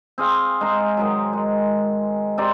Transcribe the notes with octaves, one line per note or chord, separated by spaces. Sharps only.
C4 G#4 F5
G#3 C5 A#5 C6
G#2 D#3 F#3
G#3
C3 C4 D5 A#5